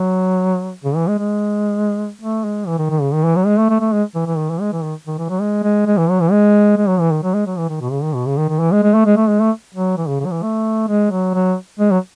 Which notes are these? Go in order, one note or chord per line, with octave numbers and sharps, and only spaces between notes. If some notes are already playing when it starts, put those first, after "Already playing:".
Already playing: F#3
C#3
E3
G#3
G#3
A3
G#3
E3
D#3
D#3
C#3
D#3
E3
F#3
G#3
A3
A3
A3
G#3
E3
E3
D#3
E3
G#3
E3
D#3
D#3
E3
F#3
G#3
G#3
G#3
E3
F#3
E3
G#3
G#3
F#3
E3
D#3
F#3
G#3
F#3
E3
D#3
B2
C#3
D#3
B2
C#3
D#3
D#3
E3
G#3
G#3
A3
G#3
A3
G#3
A3
F#3
E3
C#3
C#3
F#3
E3
A3
G#3
F#3
F#3
G#3
F#3